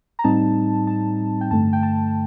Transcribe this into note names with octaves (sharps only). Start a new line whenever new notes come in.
A#5
A2 G3 C4 D#4 A5
A5
G5
G2 D3 A3 A5
G5
A5